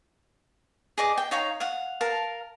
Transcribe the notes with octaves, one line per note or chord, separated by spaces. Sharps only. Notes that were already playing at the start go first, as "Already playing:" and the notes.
G#4 D#5 D6
G5
D#4 C#5 F5 A#5
F5 F#5
A#4 F5 A5